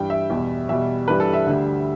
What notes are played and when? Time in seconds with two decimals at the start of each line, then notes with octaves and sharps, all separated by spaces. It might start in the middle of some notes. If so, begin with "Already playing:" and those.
Already playing: G2 E3 G3 G5
0.10 E5
0.30 E2 B2 G3
0.68 E2 B2 G3 E5
1.08 G2 E3 G3 B4
1.20 A4
1.33 E5
1.47 D2 D3 G3